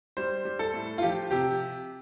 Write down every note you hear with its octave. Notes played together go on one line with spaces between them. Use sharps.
G3 C5
G3
A4
A2
F4
F3 G4
C3 G4